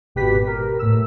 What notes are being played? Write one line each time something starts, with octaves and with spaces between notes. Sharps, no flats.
G#1 B2 G4 B4 B6
A#4
A2 E6